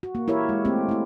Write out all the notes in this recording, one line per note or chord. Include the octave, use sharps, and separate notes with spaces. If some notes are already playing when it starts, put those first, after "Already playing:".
F#4
A#3
E4 G4 A#4 C#5 E5
G#3
A3 A#3 C4 G4
A3 E4